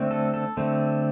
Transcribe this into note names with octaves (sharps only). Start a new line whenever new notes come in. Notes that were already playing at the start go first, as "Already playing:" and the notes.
Already playing: D3 A3 C4
A4
A4
D3 A3 C4